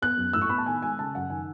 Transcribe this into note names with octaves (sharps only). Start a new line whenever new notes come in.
B3 F#6
F#2
A2 E6
C#6
B3 B5
A5
D#3 G#5
G#3 G#5
C#3 A5
F#2 F#5
D#3 G#5